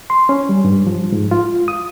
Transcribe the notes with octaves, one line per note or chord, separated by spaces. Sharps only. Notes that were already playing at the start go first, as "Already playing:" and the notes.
C6
C#4
G3
G2
F3
G#2
F4
D#6